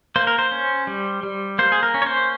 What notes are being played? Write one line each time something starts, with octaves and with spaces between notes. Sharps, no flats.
A#3 C5
A#4
C5
C#4
G3
G3
A#3 C5
G#4
A#4
C#4
C#5
C5